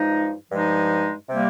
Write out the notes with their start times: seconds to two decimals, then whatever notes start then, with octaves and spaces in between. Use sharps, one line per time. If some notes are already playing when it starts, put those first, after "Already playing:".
Already playing: G2 F3 G#3 D#4
0.50 G2 F3 G#3 D#4
1.29 C3 G3 A#3